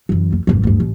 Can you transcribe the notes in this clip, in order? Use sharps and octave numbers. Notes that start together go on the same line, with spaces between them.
F#2 E3
F2
G#1 F2
D2 G2
A1